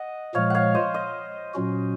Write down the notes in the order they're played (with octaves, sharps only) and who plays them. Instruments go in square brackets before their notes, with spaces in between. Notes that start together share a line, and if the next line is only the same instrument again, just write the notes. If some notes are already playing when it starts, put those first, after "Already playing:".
Already playing: [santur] D#5 F#5
[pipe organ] A#2 F3 G#3 [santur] C#5 F5
[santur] C#5 F5 F#5
C5 D#5
C5 D#5
[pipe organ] A#2 F#3 C#4 F#4